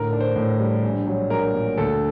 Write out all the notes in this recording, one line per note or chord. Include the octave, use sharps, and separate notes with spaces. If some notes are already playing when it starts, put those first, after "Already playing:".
Already playing: A2 D3 A#4
D4
C5
A2
G3
A#1
F#3
A#1 A#4
A#2
D2 A4